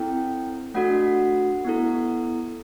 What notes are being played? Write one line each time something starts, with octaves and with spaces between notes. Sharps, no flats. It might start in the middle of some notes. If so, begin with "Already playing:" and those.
Already playing: C4 E4 A4 G5
A3 D4 F#4 A4 F#5
B3 E4 A4